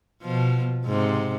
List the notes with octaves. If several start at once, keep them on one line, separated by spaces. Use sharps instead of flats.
B2 F3
G#2 C3